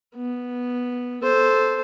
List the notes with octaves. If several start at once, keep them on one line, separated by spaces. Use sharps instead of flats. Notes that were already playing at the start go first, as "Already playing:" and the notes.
B3
A4 C5